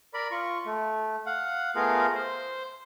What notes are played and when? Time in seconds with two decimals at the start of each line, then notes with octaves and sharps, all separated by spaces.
0.14 A#4 D5 B5
0.31 F4 C#6
0.66 A3
1.26 F5 F#5
1.75 A3 B3 F4 G#4 A#4 F5
2.15 C5